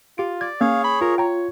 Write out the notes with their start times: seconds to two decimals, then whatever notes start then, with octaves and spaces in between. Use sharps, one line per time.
0.18 F4 G4 D7
0.41 D5 G#6
0.61 A#3 C#4 G#4 C#5 F5 G#6
0.84 B5
1.01 F4 A#4
1.18 C#5 G5 A#5